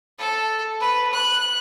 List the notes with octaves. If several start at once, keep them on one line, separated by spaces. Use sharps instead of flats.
A4
B4
F#6